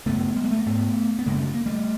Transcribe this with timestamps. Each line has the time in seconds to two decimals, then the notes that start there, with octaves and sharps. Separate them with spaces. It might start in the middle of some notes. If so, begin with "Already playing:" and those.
0.06 F#2 C#3 A3 B3
0.36 G3
0.44 G#3
0.51 A3
0.59 A#3
0.66 G#2 A3 B3
1.19 B3
1.26 F#2 C#3 G#3 A#3
1.42 A3
1.54 A#3
1.66 G3 A3